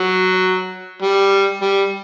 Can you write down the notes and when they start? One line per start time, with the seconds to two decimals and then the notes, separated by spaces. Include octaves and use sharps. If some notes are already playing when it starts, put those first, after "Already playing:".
Already playing: F#3
1.02 G3
1.62 G3